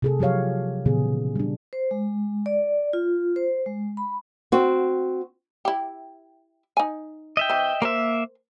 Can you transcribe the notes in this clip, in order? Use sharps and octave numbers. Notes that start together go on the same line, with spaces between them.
C3 G#4 A4
F3 F#3 G4 C#5 F5
A#2 C#3 E3 B3 G#4
G3 D4
C5
G#3
D5
F4
C5
G#3
B5
C4 F#4
E4 G4
D#4 G#5
D#5 E5 G5
E3 C4
A#3 A#4 C5 E5